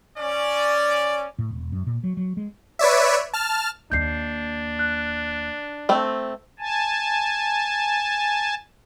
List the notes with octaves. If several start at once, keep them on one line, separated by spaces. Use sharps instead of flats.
C#4 D5
A2
E1
F#2
A#2
F#3
F#3
G#3
B4 C#5 D5 E5
A5 F6
D#2 A#3 D4 G6 C7
F#6
A3 C4
G#5 A5